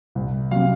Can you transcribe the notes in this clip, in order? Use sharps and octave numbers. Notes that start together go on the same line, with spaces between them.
C2
C3 F#3 F5